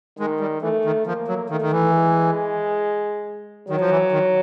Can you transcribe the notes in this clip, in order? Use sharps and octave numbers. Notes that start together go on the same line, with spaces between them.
D#3 G#3
G3
E3 A3
D#3
F3 A#3
F#3
D#3 A3
D#3
E3
G#3
D#3 F#3
F3
E3
D#3